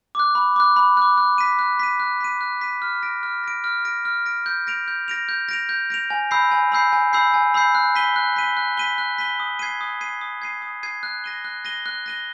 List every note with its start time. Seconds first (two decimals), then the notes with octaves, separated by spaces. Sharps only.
0.15 D6 F#6
0.35 B5
0.56 D6 F#6
0.76 B5
0.97 D6 F#6
1.17 F#6
1.38 B6 D#7
1.59 F#6
1.79 B6 D#7
2.00 F#6
2.20 B6 D#7
2.41 F#6
2.61 B6 D#7
2.82 F6
3.03 A#6 D7
3.23 F6
3.44 A#6 D7
3.64 F6
3.85 A#6 D7
4.05 F6
4.26 A#6 D7
4.46 G6
4.67 A#6 D7 F7
4.88 G6
5.08 A#6 D7 F7
5.29 G6
5.49 A#6 D7 F7
5.69 G6
5.90 A#6 D7 F7
6.10 G#5
6.31 B5 E6 G6 C7
6.51 G#5
6.72 B5 E6 G6 C7
6.93 G#5
7.13 B5 E6 G6 C7
7.34 G#5
7.54 B5 E6 G6 C7
7.75 F#6
7.95 B6 D#7 G7
8.16 F#6
8.36 B6 D#7 G7
8.57 F#6
8.77 B6 D#7 G7
8.98 F#6
9.18 B6 D#7 G7
9.40 D#6
9.59 G#6 C7 D#7
9.81 D#6
10.01 G#6 C7 D#7
10.21 D#6
10.42 G#6 C7 D#7
10.62 D#6
10.83 G#6 C7 D#7
11.03 F#6
11.24 A#6 D#7 G7
11.45 F#6
11.65 A#6 D#7 G7
11.86 F#6
12.06 A#6 D#7 G7